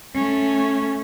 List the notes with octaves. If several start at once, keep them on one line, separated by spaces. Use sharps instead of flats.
A3 C#4